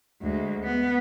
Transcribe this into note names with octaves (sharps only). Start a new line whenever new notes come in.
D2 G#3
B3